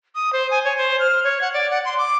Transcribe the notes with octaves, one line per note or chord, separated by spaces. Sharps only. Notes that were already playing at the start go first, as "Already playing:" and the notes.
D#6
C5
G#5
C#5
C5
F6
C#5
F#5
D5
F#5
C6
D6